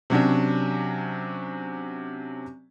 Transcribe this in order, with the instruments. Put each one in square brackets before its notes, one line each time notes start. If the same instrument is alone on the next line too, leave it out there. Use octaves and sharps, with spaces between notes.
[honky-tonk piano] C3 F#3 C#4 D4